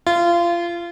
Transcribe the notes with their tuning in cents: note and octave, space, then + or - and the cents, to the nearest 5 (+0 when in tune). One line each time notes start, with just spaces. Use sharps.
F4 -25